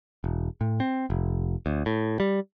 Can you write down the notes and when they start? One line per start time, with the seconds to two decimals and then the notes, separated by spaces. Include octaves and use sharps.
0.24 E1
0.61 A2
0.80 C4
1.10 F1
1.66 D2
1.86 A2
2.20 G3